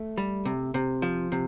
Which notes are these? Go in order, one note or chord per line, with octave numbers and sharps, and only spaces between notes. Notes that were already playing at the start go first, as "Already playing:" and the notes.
Already playing: A3
G3
C3
C3
F3
C3